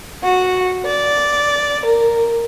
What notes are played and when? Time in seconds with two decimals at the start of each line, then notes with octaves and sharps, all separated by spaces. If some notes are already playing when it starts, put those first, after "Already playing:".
0.24 F#4
0.85 D5
1.86 A#4